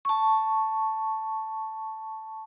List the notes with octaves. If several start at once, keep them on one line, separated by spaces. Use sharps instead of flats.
A5 C#6